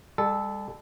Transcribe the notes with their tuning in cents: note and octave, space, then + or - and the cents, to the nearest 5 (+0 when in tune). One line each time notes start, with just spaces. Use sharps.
G3 +40 A4 -10